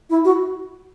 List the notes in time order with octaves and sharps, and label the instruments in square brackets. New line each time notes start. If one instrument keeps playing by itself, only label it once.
[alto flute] E4
F#4